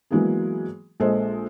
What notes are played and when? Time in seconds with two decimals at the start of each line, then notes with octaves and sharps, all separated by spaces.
0.11 E3 F#3 G#3 A#3 B3 G#4
1.00 A#1 G#3 A4 C5 D#5